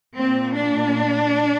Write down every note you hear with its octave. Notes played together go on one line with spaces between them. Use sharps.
A#2 C4
D4